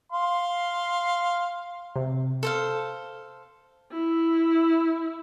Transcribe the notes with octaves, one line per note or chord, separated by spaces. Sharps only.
F5 C6
C3
A4 C5 F5
E4